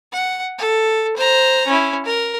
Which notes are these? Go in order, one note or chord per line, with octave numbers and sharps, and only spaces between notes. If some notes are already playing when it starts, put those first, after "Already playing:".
F#5
A4
C5 A#5
C#4 E4
A#4